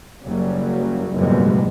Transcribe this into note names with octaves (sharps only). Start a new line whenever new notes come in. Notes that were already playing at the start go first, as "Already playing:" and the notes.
F#1 C#3 F#3 G3
F#1 F2 G#2 B2 G3 G#3